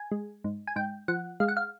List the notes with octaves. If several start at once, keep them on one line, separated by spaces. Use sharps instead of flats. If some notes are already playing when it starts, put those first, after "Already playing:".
Already playing: G#5
G#3
G#2
G#5
G#2 G5
F3 F#5
G#3 F5
F#5
F5